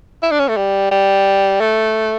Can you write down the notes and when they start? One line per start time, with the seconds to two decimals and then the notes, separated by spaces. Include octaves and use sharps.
0.23 E4
0.31 D4
0.39 C#4
0.48 A3
0.57 G3
0.91 G3
1.61 A3